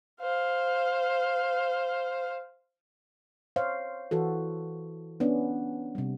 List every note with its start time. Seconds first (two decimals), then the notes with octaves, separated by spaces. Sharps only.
0.21 C5 F5
3.56 C5 C#5 F5
4.11 E3 F#4 A4
5.20 B3 C#4 D4
5.95 C3 G3